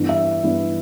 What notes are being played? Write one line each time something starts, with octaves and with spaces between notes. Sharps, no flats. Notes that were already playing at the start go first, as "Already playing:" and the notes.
Already playing: G2 E3 B3 D4
E5
G2 E3 B3 D4